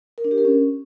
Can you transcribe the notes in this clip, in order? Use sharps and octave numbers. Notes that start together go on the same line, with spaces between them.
A#4
D4
G4
A#4
C#4